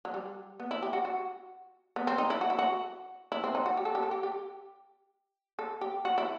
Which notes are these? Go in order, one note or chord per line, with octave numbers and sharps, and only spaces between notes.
F#3
G3
B3
E4
G4
F#4
F#4
B3
C4
D#4
E4
F#4
E4
F#4
E4
C4
D#4
F#4
G4
A4
G4
A4
G4
G4
A4
G4
F#4
E4